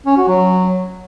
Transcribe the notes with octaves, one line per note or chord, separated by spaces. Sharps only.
C#4
F#4
F#3